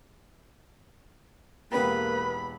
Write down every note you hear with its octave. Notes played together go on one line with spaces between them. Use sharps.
E1 A#3 B3 G4 B4 B5